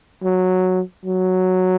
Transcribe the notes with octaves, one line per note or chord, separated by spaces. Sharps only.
F#3
F#3